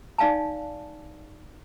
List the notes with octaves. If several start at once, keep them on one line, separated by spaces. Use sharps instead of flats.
D#4 D5 F5 G#5 A5